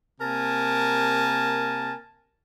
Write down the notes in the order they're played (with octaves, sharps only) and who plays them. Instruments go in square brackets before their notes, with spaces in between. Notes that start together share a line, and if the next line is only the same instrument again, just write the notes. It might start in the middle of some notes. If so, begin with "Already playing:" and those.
[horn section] C3 A#3 A#4 G#5 A5